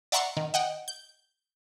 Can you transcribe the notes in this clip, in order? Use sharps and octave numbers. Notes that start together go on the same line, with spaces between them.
D5 E5 F#5 A#5 C6 C#6
D#3
D#5 F#5 G5
G6